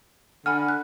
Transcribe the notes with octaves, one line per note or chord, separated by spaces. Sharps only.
D3 F#5 G#5 B5 F6
F#6